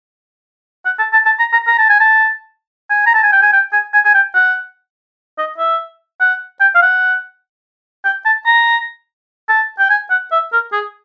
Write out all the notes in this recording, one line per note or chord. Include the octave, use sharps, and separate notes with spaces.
F#5
A5
A5
A5
A#5
A#5
A#5
A5
G#5
A5
G#5
A#5
A5
G#5
G5
G#5
G5
G#5
G#5
G#5
G5
F#5
D#5
E5
F#5
G5
F5
F#5
G5
A5
A#5
A5
G5
G#5
F#5
E5
A#4
G#4